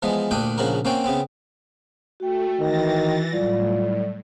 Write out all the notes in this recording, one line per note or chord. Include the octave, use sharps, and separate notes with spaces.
E3 F3 G#3 B3
D2 A#2 D4 G5 D#6
A#1 C#3 F3 F#4 A#4
A#3 C4 C#4 F#4 G5
C#3 B3 C4
A3 F#4 G5
D#3 E3 A6 A#6
A2 F#3 G3 F4 D5